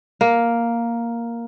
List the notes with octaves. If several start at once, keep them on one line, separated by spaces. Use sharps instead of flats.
A#3